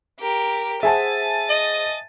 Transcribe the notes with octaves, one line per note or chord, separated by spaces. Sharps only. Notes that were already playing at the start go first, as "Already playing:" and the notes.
G4 A#4
G#4 C5 E5 F#5 G#5 A5 A6 D#7
D#5